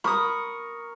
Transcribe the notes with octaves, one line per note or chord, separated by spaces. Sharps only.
A#4 B5 C#6 D#6